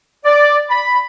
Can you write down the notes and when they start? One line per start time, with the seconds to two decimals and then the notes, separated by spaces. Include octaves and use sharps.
0.25 D5
0.70 B5